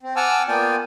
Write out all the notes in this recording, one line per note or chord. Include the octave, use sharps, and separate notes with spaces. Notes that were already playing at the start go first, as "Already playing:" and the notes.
C4
F#5 G#5 A5 D6 E6 F6
A#3 B3 F4 D5 G5 G#5